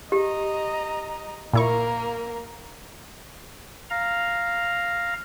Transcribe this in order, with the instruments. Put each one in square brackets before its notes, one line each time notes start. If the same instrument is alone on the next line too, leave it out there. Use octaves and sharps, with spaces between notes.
[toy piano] G4 [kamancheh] D#5 A#5
[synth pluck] A#2 E4 C#6 [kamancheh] A#3 A#4
[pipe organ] F5 A#5